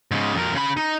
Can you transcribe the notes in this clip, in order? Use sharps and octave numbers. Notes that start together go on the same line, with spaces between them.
G#2 C#3
F2 A#4
C#3 B5
D#4